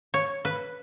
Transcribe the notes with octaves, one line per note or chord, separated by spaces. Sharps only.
C#5
B4